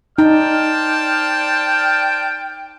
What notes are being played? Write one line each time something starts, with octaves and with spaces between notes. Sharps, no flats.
D#4 C5 D5 G5 A5 F6